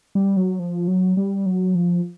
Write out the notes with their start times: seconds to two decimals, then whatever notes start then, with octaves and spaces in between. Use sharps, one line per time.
0.15 G3
0.37 F#3
0.59 F3
0.88 F#3
1.17 G3
1.46 F#3
1.75 F3